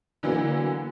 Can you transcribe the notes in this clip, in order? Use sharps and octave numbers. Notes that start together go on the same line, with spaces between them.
D3 E3 F#3 A#3 B3